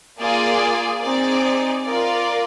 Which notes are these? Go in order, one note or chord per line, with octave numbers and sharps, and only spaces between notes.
A#3 F4 G#4 D5 G#5
C4 D#4 G#4 D5
F4 A#4 D5